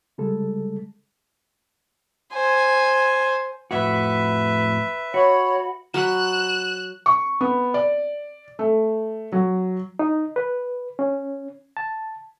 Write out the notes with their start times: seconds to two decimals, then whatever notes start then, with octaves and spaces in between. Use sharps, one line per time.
0.18 C#3 G3 G#3 A4
2.33 C5 G#5
3.71 F2 A2 F#4 B4 E5
5.14 F#4 C#5 B5
5.94 F#3 B5 F#6 E7
7.06 C#6
7.41 B3
7.74 D5
8.59 A3
9.32 F#3
9.99 D#4
10.36 B4
10.99 C#4
11.77 A5